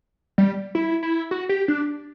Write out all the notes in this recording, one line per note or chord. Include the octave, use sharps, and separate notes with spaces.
G3
E4
E4
F#4
G4
D4